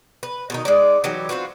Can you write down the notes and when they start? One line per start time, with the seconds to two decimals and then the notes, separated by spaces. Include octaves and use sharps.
0.23 B4
0.50 B2 D#3 D#4
0.65 G#3 D#4 D5
1.04 E3 F#3 D#4 G4
1.29 C4 F4 F#4 B4